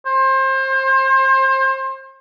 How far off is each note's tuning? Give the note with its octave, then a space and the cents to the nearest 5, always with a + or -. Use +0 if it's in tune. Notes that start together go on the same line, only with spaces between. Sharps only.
C5 +30